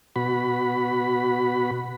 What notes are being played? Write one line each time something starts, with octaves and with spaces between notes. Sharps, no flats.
B2 F#4 B5